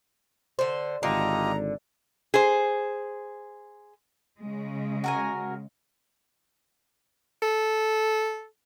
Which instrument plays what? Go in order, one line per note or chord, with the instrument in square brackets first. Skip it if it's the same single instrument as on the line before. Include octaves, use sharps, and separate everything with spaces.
[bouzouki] D3 C5
[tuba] G#1 [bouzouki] D3 [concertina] F4 G4 D#5 [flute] A#5
[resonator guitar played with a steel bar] G#4 C5
[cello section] C#3 G#3
[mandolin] F#4 A#4 G#5
[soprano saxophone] A4